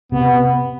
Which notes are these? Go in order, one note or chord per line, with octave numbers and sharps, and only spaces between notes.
C3 B3